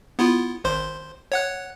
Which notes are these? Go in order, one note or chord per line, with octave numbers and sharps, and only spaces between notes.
B3 E4 F4
G#1 C5 C6
C#5 F#5 F#6